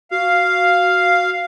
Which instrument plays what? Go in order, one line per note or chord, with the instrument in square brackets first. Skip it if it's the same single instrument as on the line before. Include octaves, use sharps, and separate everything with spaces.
[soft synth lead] F#4 [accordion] F5